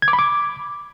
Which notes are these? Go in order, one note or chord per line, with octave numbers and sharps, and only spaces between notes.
G#6
D6
B5
D6